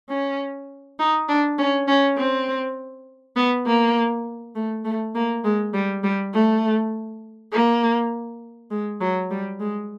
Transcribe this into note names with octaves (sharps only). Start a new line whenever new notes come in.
C#4
D#4
D4
C#4
C#4
C4
B3
A#3
A3
A3
A#3
G#3
G3
G3
A3
A#3
G#3
F#3
G3
G#3